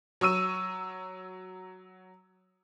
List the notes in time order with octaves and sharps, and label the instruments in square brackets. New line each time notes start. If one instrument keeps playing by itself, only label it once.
[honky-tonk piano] F#3 C#6 E6 D#7